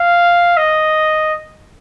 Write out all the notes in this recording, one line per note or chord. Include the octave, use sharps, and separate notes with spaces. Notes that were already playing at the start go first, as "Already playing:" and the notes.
Already playing: F5
D#5